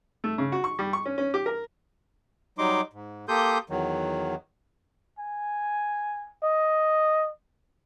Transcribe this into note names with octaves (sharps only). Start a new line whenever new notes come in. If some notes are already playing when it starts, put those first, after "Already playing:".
A3
C#3
F#4
C#6
G3
C#6
C#4
C#4
G4
A#4
F#3 G3 D#4 C6 D6
G#2
A#3 G4 A4 C6 D#6 G6
E2 D#3 F#3
G#5
D#5